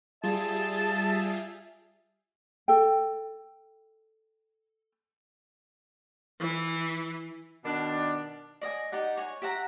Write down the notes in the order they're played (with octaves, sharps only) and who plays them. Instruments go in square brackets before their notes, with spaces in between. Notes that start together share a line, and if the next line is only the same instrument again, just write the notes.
[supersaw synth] G3 F4 G#4 [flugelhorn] E5 [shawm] A5
[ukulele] A4 G5
[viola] E3
[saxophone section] B2 D#3 D4
[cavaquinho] D5 D#5 F5 G#5
D#4 G4 D5 F#5
C#5 G#5
G4 E5 F#5 A#5